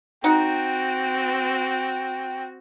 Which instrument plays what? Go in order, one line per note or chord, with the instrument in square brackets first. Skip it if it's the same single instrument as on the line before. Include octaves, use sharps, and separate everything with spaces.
[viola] C4 F#4 [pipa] D#4 F#5 [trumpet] G5